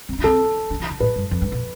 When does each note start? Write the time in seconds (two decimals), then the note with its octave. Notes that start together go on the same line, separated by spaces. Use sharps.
0.09 C4
0.19 D4
0.24 C4 A4
0.70 D4
0.80 E3
0.90 D3
1.00 A2 B4
1.16 G2
1.31 F2
1.42 G2
1.52 B2